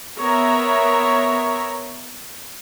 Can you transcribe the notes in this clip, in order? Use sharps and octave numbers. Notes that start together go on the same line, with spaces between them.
B3 A#4 C#5 E5 A#5